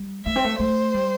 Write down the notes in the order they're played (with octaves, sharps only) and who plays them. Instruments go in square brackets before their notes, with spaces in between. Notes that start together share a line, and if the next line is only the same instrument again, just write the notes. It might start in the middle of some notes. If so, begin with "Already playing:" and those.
Already playing: [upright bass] G3
[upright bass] A3 [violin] E5
[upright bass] C4
A3
[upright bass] A3 [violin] C5
[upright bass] G3